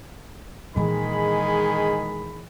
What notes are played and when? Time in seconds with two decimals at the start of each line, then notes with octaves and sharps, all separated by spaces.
0.76 A#2 D#3 E3 G#3 G#4 B5